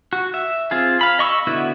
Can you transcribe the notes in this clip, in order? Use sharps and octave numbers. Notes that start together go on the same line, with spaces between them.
F#4
E5
C4 F4 G#4
F5 B5
D#5 C#6 D#6 E6
D3 B3 E4 F#4